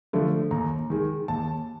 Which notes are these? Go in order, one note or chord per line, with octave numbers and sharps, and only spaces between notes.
D3 F3 A3
D#2 A#5
D#3 G#3
D#2 A5